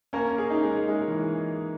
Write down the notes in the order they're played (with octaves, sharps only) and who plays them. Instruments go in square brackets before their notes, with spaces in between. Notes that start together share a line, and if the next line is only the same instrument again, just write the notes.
[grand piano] A#3 A#4 [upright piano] C#4
[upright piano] G#4
[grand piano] D#4
[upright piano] G#3
[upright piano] G#3 [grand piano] D#4
[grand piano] E3